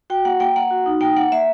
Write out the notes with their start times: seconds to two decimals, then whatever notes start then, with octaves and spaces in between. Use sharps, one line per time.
0.10 F#4 G5
0.25 A#3 F#5
0.40 A#3 G5
0.56 A#3 F#5
0.71 F#4
0.86 D#4
1.01 A#3 G5
1.16 A#3 F#5
1.32 A#3 E5